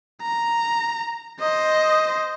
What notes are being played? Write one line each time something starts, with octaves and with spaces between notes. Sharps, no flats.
A#5
C5 D#5